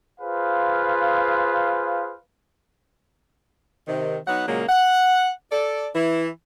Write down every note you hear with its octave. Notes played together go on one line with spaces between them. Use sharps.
F4 G#4 B4 C5 F5
C3 D#3
F#3 B3 D#4 F#5
A#2 C#3 F#3 G#3 A#3
F#5
A4 D5
E3 E4